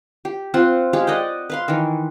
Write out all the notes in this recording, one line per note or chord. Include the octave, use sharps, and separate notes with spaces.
G4
C4 F4 F#5 C6
G#3 G4 G#4 F5
D5 D#5 F#5 G5
B4 F5 C6
D#3 E3